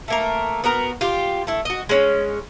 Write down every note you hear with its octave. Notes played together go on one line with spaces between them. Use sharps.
A3 A#3 A#4
B3 F#4 A#4
F4 G4
A3 E4
F#4 D#5
G#3 C#4